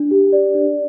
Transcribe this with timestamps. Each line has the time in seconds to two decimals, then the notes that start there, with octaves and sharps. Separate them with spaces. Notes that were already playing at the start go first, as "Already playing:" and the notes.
Already playing: D4
0.11 G4
0.32 D5
0.55 D4